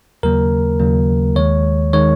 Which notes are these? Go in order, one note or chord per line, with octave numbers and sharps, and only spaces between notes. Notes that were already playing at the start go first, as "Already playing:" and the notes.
D#2 C#3 F#3 A#3 A#4
D#2 C#3 F#3 A#3
D#2 D#3 G#3 C#5
D#3 G#3 C#5